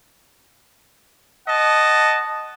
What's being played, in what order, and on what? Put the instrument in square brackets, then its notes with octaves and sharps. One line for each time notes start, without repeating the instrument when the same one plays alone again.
[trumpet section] D#5 F#5 A5